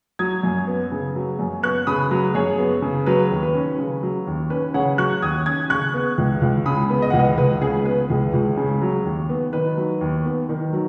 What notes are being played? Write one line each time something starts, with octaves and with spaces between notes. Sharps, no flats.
F#3 D#6 G#6
F#2
B3
C#3
F#3
F#2
B3 C#6 F#6
C#3 B5 D#6
F#3
F#2 G#4 C#5
B3
C#3
F#3 B4
D#2
B4
C#4
C#3
F#3
D#2
C#4 B4
C#3 C#5 F#5
F#3 C#6 F#6
D#2 D#6 G#6
C#4 D#6 G#6
C#3 C#6 F#6
B3
C#2
C#2
C#3 B5 D#6
B3
D#5
C#2 F#5
B4 D#5
C#2 B4
C#3 G#4
B3 B4
C#2 G#4
C#2
C#3
F#3
D#2
B3
D#3 B4
F#3
D#2
B3
D#3
F#3